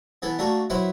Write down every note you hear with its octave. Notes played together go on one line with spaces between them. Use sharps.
E3 B3 E4 A4
A3 A#3 D4 F#4 A4
F#3 E4 B4 C5 E5 F#5